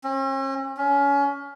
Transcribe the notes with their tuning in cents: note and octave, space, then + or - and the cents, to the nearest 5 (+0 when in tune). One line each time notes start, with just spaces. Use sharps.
C#4 -45
C#4 +25